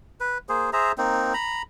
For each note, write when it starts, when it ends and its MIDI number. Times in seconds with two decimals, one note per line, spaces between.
0.20 0.38 71
0.49 0.70 58
0.49 0.70 68
0.49 0.70 72
0.73 0.92 68
0.73 0.92 72
0.73 0.92 76
0.73 0.92 82
0.98 1.33 58
0.98 1.33 60
0.98 1.33 63
1.34 1.62 82
1.34 1.62 83